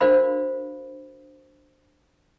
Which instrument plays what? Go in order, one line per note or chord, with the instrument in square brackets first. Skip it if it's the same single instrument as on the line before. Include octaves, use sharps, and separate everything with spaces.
[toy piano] D4 F#4 A#4 C5 F5 B5